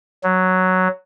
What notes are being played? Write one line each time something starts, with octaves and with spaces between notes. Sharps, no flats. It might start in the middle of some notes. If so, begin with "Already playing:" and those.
F#3